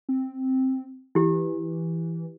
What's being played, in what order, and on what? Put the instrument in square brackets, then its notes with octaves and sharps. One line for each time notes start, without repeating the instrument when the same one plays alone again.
[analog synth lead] C4
[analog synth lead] E3 [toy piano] E4 G4